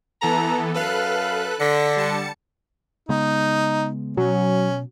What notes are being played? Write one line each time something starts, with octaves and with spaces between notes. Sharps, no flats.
E3 B3 A4 A5 A#5
F#2 A4 B4 F5 F#6
D3 A#6 B6 C#7
G3 A5 C#7
C#3 G#3 B3 D#4
B2 F#3 C#4